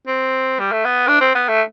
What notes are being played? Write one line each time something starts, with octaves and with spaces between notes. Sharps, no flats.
C4
G3
A3
B3
D4
C4
B3
A3